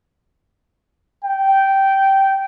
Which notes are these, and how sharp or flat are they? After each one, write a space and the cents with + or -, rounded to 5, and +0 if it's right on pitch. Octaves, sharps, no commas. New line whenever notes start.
G5 -10